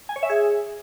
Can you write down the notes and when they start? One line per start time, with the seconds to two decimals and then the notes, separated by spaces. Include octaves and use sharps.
0.09 G#5
0.16 C#5
0.23 E5
0.30 G#4